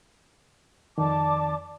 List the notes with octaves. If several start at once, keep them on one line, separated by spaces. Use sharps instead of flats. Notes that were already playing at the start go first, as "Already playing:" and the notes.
F2 D#3 D5 A5 D6